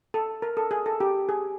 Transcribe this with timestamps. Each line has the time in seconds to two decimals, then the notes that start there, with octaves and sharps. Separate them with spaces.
0.14 A4
0.42 A#4
0.57 A4
0.71 G#4
0.86 A4
1.00 G4
1.29 G#4